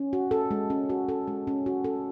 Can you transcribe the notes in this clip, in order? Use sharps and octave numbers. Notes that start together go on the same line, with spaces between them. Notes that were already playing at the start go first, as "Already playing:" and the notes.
Already playing: C#4
F#4
A4
G#3
C#4
F#4
A4
G#3
C#4
F#4
A4